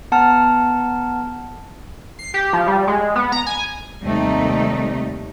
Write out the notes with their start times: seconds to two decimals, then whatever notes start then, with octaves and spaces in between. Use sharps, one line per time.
0.12 B3 F#5 A5 A#5 F6
2.19 C7
2.34 G4
2.53 F3
2.68 G3
2.87 G#3
3.16 B3
3.32 A#5
3.46 G#5
4.04 D#2 C3 G3 A3 D#4